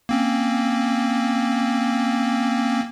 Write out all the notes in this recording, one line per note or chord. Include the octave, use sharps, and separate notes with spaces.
A#3 C4 C#4